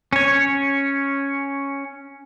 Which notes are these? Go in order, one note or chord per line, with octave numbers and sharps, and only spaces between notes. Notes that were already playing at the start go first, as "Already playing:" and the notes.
C#4 C#5